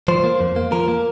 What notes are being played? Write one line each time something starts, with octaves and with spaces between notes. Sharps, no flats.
F3 C5
A#3
F2
A#3
F3 A#4
A#3